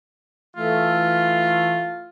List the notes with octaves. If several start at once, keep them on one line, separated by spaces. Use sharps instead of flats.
E3 A3 F4